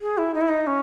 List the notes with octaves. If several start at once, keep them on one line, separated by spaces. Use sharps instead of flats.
G#4
E4
D#4
E4
D#4
C#4